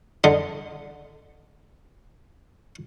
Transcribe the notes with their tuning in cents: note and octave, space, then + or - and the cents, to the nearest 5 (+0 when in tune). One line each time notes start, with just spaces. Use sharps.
D3 +0 D#5 -10